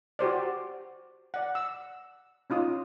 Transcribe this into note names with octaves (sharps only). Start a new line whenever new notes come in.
F#4 G4 C5 D5
D5 F#5
E6
C#4 D#4 F4 D#6